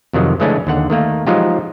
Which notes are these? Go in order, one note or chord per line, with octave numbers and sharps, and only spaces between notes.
F2 C3 D#3 F#3
C#3 E3 G#3 A3 C#4 D4
D#2 D3 F#5
D#3 A3 A#3
F3 F#3 G#3 D#4 F4 G4